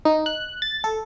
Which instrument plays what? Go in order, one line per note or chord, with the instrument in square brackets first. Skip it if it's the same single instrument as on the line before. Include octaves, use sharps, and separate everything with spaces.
[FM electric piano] D#4
F#6
A6
A4